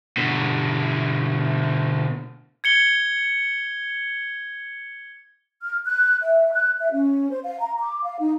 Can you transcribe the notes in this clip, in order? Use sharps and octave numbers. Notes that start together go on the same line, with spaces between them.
B2 D3
G#6 C#7 G7
F6
F#6
E5
F#6
E5
C#4
C5
F5
A#5
D6
F5
D#4